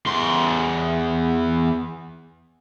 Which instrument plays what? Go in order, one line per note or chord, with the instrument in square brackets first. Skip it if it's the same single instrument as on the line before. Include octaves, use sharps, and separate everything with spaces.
[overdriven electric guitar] E2 C6